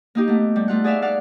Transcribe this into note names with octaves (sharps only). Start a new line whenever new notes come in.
A#3 D#4 G4
A3 B3
G3
A3 F4 F#5
G#4 D5 E5 F5
D5 F5 F#5 F6